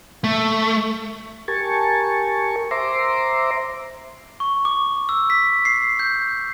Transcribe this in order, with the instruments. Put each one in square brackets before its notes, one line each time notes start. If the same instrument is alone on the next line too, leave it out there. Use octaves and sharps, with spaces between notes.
[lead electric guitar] A3
[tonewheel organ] G4 A#4 G#5 A5 C#6
C5 E5 A#5 C6 D6
[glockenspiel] C#6
D6
E6
B6
C7
G6